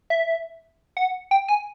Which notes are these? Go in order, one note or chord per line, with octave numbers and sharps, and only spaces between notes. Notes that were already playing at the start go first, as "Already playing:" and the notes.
E5
F#5
G5
G#5